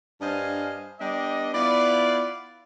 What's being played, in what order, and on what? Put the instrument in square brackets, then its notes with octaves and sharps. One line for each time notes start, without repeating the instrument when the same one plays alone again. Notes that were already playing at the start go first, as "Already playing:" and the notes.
[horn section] G2 D4 C5 D#5 F5 G#5
G3 B3 D4 G4 D#5
B3 E4 F4 D5